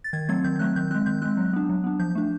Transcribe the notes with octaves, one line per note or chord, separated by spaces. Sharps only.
A6
D#3 G#6
F#3 A3 C4 G#6
D#3 G6
F#3 A3 C4 F#6
D#3 G6
G#3 C4 F#6
D#3 G6
G#3 C4 F#6
F#3
B3 D4
F#3
B3 D4
F3 G6
A3 D4